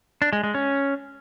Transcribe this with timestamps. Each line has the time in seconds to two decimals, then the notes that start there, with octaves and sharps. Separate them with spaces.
0.22 D4
0.33 G#3
0.44 G#3
0.54 C#4